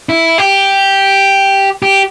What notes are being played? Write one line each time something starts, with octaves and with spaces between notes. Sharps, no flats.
E4
G4
G4